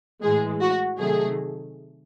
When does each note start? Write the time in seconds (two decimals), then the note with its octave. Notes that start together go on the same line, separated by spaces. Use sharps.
0.23 A2 E3 G#3 G#4
0.61 F#4
0.99 C3 D#3 F#3 A3 G#4